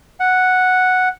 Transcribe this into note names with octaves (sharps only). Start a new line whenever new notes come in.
F#5